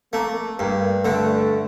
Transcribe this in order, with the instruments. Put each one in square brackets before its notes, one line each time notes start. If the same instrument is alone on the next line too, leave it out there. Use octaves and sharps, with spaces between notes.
[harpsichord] A3 [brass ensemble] A#3
[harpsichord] G2 [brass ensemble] A#3
[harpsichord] D3 [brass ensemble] A3